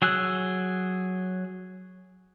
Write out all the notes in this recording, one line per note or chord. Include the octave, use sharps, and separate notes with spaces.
F#3 G#4 E6 F#6